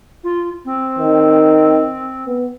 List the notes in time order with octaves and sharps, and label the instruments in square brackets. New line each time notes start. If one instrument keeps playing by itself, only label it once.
[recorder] F4
C4
[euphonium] D#3
B3